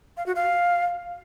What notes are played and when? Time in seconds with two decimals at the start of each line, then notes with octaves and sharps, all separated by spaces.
0.17 F5
0.26 F#4
0.35 F5